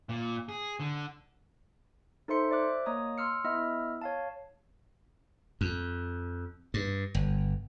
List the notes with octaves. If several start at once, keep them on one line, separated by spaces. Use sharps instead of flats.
A#2
G#4
D3
D#4 A4 C5 E5 C6 C#7
C5 D5 E5 D6 F#6
A#3 C#5 D#5 A#5 D#6
C6 E6 F6 C#7
B3 E4 D#5 E5 E6 F6
C#5 F5 A5
F2
G2
G1